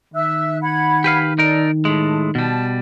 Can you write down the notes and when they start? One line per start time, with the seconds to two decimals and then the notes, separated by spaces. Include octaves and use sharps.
0.14 D#3 E5 E6 F#6
0.61 F#5 B5 G#6
1.04 G4 B4 F5
1.39 D#4 A4 A#4 D5
1.85 A2 G#3 A5
2.35 B2 G3 A5